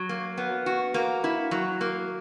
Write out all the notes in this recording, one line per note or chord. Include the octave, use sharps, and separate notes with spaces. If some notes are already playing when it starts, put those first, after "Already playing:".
Already playing: F#3
A#3
B3
F#4
A#3
E4
F#3
A#3